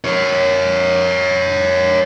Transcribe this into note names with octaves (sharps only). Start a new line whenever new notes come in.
A#4 C#5